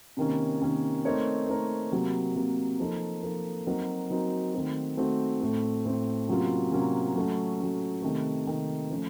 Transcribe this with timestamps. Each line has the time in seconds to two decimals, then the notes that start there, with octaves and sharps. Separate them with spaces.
0.17 C3 D#3 A#3 C#4
0.61 C3 D#3 A#3 C#4
1.05 A3 C4 D#4 A#4 C#5
1.48 A3 C4 D#4 A#4 C#5
1.92 C3 F#3 A#3
2.36 C3 F#3 A#3
2.80 F3 A#3 D#4 A4
3.23 F3 A#3 D#4 A4
3.66 F#3 C4 D#4 F#4 A#4
4.10 F#3 C4 D#4 F#4 A#4
4.54 D#3 A3 C4 F#4
4.97 D#3 A3 C4 F#4
5.41 A2 A3 C4
5.85 A2 A3 C4
6.28 C3 F#3 A#3 C#4 F4
6.72 C3 F#3 A#3 C#4 F4
7.15 F#3 A3 C#4
7.59 F#3 A3 C#4
8.02 C3 D#3 A3
8.47 C3 D#3 A3
8.90 F3 A3 C#4